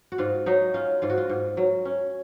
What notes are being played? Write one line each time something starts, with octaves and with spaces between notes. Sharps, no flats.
F#4
G#2 F4
F#3 D#4
C#4 F4
G#2 F4
F#4
F4
G#2
F#3
C#4